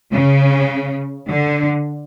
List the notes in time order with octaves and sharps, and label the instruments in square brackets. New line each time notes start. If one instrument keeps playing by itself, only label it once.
[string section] C#3
D3